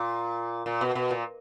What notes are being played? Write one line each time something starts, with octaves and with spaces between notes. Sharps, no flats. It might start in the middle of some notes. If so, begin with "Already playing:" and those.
Already playing: A#2
A#2
B2
B2
A#2